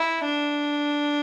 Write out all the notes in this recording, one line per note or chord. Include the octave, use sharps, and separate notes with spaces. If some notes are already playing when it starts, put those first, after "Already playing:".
Already playing: E4
D4